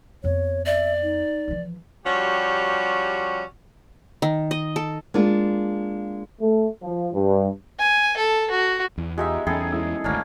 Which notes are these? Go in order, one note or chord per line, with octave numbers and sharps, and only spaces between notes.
F2 B3 C#5
D5 E5
D#4
E3 F3
F3 G3 C#4 F#4 G4
D#3
D#5
A4
G#3 A#3 D4 F4
A3
F3
G2
G#5
A4
F#4
E2
G#3 D#4 F4 G4 E5
E2 C#4 D#4 G#4 A4 G5 B5 G#6
G#3 E4 E6
G#1 D2 A#3 C#4 D4